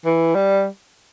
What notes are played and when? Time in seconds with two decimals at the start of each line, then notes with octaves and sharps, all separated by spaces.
0.05 E3
0.35 G3